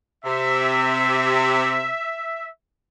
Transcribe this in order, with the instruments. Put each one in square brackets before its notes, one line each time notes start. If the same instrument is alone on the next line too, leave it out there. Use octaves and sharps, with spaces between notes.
[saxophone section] C3 [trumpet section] E5